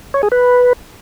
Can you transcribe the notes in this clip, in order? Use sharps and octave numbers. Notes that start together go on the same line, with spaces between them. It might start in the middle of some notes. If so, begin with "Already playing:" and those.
C#5
G#4
B4